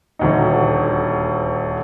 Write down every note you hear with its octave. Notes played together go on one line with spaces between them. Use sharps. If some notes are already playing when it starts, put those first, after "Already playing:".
D#1 D2 D#4